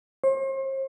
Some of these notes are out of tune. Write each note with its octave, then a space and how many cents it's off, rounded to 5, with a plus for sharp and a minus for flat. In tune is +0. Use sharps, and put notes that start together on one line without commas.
C5 +40